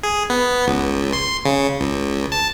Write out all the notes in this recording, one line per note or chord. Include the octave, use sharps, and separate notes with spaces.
G#4
B3
C#2
C6
C#3
C#2
A5